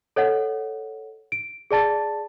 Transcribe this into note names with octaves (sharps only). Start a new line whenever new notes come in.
A4 C#5 D#5 F#5
D7
G#4 D5 A5 A6